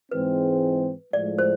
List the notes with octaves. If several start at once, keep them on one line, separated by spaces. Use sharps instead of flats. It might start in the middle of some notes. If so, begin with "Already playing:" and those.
G#2 E3 G#3 C4 B4
A2 F3 G#3 D5
C5